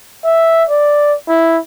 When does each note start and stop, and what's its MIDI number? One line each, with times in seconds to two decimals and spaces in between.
0.24 0.64 76
0.69 1.15 74
1.28 1.59 64